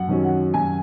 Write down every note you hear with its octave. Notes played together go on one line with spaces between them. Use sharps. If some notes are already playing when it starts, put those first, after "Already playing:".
Already playing: F#2 F#5
D#3 F#3 C#4
F#5
F#2 G#5